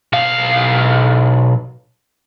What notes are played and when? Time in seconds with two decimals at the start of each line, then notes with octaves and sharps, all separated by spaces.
0.13 B1 F5